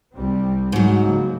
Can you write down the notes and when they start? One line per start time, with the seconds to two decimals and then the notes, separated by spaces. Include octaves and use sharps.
0.14 C2 G3 C4
0.72 G#2 F#3
1.01 C#3 F3 A#3